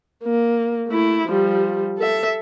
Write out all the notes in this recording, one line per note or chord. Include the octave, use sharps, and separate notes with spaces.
A#3
A3 E4
F3 G3
A4 E5